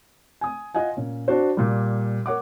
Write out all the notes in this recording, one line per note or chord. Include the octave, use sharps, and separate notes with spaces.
G#5 D#6
F4 D#5 F#5 G#5
A#2 C#4
D4 F#4 C5
A#2 G3
A#4 C#5 F#5 D6